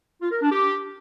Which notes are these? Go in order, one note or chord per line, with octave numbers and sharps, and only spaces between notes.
F4
A#4
D4
G4